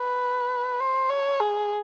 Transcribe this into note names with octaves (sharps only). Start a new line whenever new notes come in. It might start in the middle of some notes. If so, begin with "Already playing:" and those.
Already playing: B4
C5
C#5
G#4